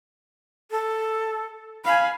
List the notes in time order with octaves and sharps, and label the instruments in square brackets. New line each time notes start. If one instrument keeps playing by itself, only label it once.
[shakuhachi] A4
[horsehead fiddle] F5 G#5 [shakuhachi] B5